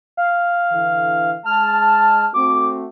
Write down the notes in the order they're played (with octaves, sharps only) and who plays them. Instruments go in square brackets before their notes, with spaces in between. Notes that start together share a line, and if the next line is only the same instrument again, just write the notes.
[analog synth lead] F5
[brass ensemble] D3 E3
[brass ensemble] G#3 A5 [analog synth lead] F6
[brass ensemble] A3 C4 F#4 [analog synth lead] D6